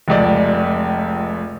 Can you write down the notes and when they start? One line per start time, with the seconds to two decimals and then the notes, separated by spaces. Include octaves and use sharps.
0.08 F1 C#2 D5